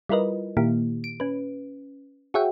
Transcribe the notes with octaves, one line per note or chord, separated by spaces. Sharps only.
G3 E4 F4 A#4 B4 D#5
A#2 D#3 A#3 E4 G4
D7
C#4 B4
F#4 G#4 C#5 E5 F#5 G5